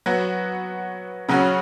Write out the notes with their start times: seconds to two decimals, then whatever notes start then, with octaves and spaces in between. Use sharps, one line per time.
0.06 F#3 B3 F#4
1.29 C#3 F#3 C#4 F#4